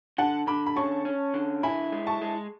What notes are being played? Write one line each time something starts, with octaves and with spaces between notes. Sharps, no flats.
D3 F#5 A5
D3 B5 D6
B5
C#4 A5 C#6
C#4
D3
E4 G#5 B5
G#3
A5 C#6
G#3